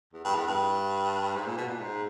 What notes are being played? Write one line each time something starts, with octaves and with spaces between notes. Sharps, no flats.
E2
G2
E2
G2
G#2
A#2
B2
A#2
G#2